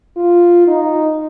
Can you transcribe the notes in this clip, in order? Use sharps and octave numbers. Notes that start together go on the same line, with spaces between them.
F4
D#4